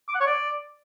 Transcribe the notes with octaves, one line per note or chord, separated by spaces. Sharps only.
D6
F#5
C#5
D5